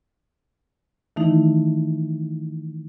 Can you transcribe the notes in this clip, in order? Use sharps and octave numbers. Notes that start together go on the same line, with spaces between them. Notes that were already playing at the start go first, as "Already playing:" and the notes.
D#3 E3 A3 D#4 E4